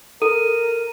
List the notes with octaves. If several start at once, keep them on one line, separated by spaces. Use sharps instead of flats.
A4 A#4 D#7